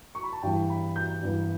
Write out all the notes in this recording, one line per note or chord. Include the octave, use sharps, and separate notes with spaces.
C#6
B5
A5
G2 E3 B3 G5
B5
G6
G2 E3 B3